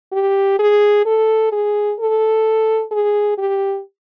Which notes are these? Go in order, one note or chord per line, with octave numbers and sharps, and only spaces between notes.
G4
G#4
A4
G#4
A4
G#4
G4